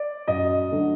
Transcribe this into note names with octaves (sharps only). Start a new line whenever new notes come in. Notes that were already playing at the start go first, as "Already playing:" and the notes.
Already playing: D5
F#2 D#5
D3 F#3 A3